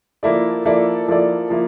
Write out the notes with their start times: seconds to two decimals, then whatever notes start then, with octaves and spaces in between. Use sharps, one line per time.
0.23 F3 A#3 E4 A4 D5
0.65 F3 A#3 E4 A4 D5
1.08 F3 A#3 E4 A4 D5
1.50 F3 A#3 E4